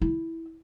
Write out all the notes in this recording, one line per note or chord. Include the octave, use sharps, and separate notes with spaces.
E4